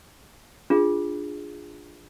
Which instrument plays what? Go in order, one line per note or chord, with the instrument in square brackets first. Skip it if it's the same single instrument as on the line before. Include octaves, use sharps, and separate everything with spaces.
[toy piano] D4 F4 G#4